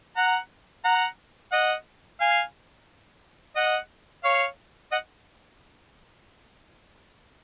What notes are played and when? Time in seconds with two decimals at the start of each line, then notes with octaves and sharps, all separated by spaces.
0.16 F#5 A#5
0.85 F#5 A#5
1.52 D#5 F#5
2.20 F5 G#5
3.56 D#5 F#5
4.24 C#5 F5
4.92 D#5 F#5